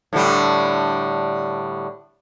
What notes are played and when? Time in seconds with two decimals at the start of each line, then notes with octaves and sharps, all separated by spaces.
0.13 A2 D3 G3